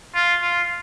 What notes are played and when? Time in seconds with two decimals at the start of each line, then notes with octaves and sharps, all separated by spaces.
0.14 F4
0.42 F4